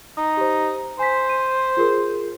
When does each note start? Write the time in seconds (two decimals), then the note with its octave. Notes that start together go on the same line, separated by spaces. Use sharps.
0.17 D#4
0.37 G4 C5
0.99 C5 G#5 B6
1.29 D#7
1.77 F4 G#4 A#4